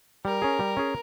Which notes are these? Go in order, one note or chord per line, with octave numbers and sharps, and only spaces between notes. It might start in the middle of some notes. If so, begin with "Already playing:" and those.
G3 A#4
C#4 G#4
G3
C#4 G#4